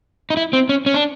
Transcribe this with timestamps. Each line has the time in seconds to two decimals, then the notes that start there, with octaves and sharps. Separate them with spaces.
0.30 D#4
0.37 E4
0.53 C4
0.69 C#4
0.86 C#4
0.94 D4